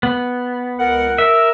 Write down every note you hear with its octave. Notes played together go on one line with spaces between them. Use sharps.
B3
C#2 A#4 F#5
A#4 E5